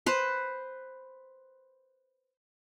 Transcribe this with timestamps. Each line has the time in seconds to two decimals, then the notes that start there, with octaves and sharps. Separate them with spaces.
0.06 B4 C5